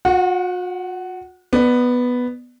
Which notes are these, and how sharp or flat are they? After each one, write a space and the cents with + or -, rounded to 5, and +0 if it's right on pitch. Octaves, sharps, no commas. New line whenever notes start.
F#4 -45 F#5 +10
B3 +0 D5 +30